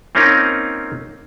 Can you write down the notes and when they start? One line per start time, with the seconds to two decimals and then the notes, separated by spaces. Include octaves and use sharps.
0.15 A#3 C4 C#4 D#4 F4 A#4